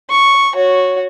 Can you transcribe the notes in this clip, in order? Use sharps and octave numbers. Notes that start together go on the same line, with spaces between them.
C#6
F#4 C#5